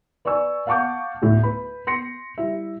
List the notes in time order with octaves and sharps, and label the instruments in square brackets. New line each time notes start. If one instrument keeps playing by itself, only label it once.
[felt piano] B4 D5 G#5 C#6 E6
F5 F#5 A5 C#6 D6 G6
D2 A2
B4 B5
C6 A#6 C#7
G3 E4 E5